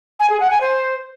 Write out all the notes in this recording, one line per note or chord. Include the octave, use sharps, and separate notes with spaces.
G#5
G#4
F#5
G#5
C5